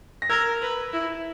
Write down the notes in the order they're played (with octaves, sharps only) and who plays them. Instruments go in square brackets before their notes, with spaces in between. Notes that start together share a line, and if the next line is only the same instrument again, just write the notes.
[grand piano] A#6
[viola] A#4 [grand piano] E6 G#6
[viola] B4
E4